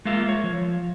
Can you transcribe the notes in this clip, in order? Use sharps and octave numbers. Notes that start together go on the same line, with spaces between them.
G#3 A#3 F4 E5
C#5
F3